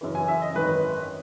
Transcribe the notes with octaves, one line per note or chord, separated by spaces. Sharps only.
F#2 C#3 E3
G#5
E5
D#5
G#1 F#2 D#3 B4